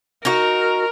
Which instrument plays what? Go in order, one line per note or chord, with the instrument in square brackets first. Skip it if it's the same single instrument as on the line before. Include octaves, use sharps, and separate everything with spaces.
[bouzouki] D#4 F#4 [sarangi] A#4